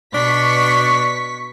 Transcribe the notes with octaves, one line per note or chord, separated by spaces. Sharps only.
B2 D4 C#6 B6